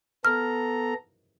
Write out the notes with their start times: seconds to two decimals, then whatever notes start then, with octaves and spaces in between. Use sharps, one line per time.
0.25 B3 A4 A#5 F6